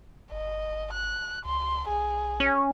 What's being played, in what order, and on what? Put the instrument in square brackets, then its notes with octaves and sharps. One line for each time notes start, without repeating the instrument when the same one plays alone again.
[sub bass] G1 [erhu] D#5
[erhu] F#6
[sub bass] C#2 [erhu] C6
[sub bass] B1 [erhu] G#4
[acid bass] C#4